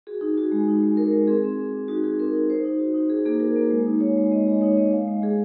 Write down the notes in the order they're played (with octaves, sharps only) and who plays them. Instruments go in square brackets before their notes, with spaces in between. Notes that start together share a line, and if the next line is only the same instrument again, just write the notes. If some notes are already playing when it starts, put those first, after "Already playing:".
[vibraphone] F#4 G#4
D#4 G#4
F#4
G#3
D#4
G#3
G#3 A#4
G#3
C4 G#4
C4
C4
C4
D#4 F#4
F#4 G#4
C4 A#4
D#4
D#4 C5
D#4
F#4
D#4
D#4 G#4
A#3 G#4
F#4 A#4
A#3
G#3
D#4
G#3 C#5
G#3
G#3 D#5
G#3
D#4 C#5
G#3 D#5
G#3 F5
G#3
G#3 G#4